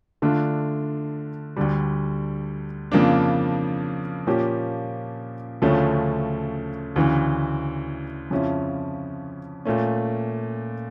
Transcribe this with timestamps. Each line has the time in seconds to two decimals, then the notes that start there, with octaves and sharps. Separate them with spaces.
0.22 D3 A3 D4 F4
1.56 D2 D3 G3
2.92 F2 C#3 F3 A#3 D4
4.27 A#2 F3 A#3 C#4 G4
5.62 D2 C#3 F3 A3 C#4
6.96 D2 C#3 E3
8.31 F2 C#3 F3 C#4 E4
9.65 A#2 A3 C#4